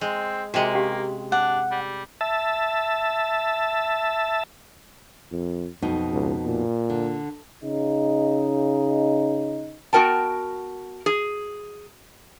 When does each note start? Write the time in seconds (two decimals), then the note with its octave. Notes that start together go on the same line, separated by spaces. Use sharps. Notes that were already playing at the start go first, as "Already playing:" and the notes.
0.01 G#3 C4
0.54 C3 G#3 A#3 F#4 G5
0.75 C#4 G4 F5
1.32 D4 F#5
1.71 G3
2.21 E5 A5
5.32 F2
5.82 B1 F2 B2 D#4
6.12 C#2
6.46 A#2
6.90 D3
7.64 C#3 D#4
9.93 B3 F#4 A#4 G5 A5
11.06 G#4